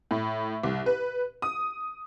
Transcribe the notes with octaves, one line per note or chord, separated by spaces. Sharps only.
A2
C2
B4
D#6